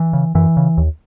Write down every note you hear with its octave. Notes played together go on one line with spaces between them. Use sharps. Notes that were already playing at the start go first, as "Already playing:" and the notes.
Already playing: E3
C#3
F#2 E3
C#3
D#2